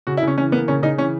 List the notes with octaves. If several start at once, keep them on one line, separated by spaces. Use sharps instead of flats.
C#3 F#4
E4
C#3 C#4
E3 C#4
A#3 B3
C#3 C#4
C#3 D#4
E3 C#4